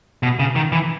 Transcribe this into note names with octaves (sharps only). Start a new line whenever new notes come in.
B2
C#3
D#3
E3